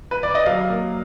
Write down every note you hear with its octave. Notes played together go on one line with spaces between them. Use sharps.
B4
D5
D#5
F#3 F5
A#3